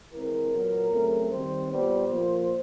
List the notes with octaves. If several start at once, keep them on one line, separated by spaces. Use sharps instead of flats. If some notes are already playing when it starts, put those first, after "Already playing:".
E3 G#3 C4 A#4
A#2 F#3 B3
C#3 F#3 A3 C4
D#3 G3 C4 C5
A#2 G3 B3 C5
A#2 F3 A#3